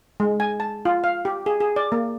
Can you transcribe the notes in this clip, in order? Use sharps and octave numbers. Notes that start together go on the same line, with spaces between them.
G#3
G#5
A5
F4
F5
G4
G#4
G#4
D5
A#3